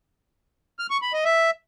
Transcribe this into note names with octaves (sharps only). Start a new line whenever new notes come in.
F6
C#6
B5
D#5
E5